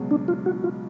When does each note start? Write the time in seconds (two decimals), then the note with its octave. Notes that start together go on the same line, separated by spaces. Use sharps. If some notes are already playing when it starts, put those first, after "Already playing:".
Already playing: C#2 B2 F#3
0.11 D4
0.28 F4
0.46 F#4
0.64 F4